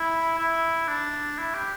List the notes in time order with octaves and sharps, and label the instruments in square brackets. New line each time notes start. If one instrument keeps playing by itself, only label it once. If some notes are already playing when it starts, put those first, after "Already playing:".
Already playing: [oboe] E4
E4
D4
E4
G4